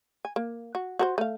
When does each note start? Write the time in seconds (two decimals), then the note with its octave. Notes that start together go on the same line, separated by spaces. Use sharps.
0.25 G#5
0.36 A#3
0.75 F#4
0.99 F#4 A#4 C5
1.18 A3 F5